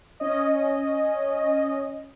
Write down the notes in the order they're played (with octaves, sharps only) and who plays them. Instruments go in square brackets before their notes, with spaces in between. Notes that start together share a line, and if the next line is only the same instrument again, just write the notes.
[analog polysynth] C#4 D#5